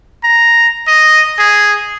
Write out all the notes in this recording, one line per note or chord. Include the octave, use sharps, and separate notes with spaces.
A#5
D#5
G#4